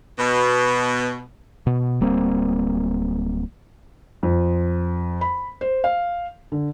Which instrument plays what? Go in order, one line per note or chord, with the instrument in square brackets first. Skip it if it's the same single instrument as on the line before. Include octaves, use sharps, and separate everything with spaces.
[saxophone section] B2
[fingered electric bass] B2
D1 G3 A#3 C4
[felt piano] F2
B5
C5
F5
D3